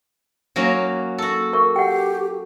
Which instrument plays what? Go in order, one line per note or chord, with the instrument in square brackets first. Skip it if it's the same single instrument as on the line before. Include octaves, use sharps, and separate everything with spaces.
[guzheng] F#3 A#3 C#4
F#4 A4
[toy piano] A#4 C#6
[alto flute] G4 [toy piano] F#5 G5